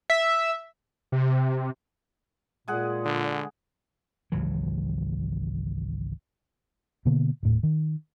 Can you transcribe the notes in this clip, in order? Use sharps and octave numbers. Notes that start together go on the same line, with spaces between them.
E5
C3
A#2 G#3 G#4 F#5
D3
G#1 C#2 E3 F#3
B2 D3 A#3 B3
D#1 A2
D#3